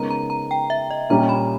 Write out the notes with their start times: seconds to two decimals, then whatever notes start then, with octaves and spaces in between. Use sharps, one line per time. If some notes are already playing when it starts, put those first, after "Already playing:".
Already playing: C#3 G#3 B3 D#4 A#4 A#5
0.10 A#5
0.30 A#5
0.51 G5
0.70 E5
0.91 D#5
1.10 A#2 G3 C#4 G4 A#5
1.29 B5